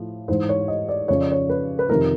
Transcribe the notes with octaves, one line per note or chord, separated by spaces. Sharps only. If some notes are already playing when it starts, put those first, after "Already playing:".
Already playing: A2 F3
G#2 E3 C5
C#5
D#5
D5
F2 C#3 F3 C#5
D5
C#5
B4
B4
F2 C3 D#3 A#4